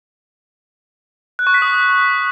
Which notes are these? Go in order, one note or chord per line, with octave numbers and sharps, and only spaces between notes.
F#6
C#6
B6
D#6